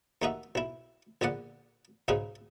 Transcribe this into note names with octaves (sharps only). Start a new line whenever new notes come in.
D#2 A3 D#4 F#4 E5
B1 E4
A#1 D3 B3 D5 F#5
B1 G#2 C#3 D#4 G#4 B4